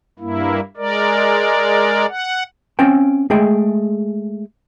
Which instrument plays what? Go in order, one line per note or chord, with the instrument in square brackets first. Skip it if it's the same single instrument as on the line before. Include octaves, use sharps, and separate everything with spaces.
[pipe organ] G2 A#3 E4
G#3 A#4 D5
F#5
[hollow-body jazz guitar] C4 C#4 F5 G5
G#3 A3 G#4 E5 G5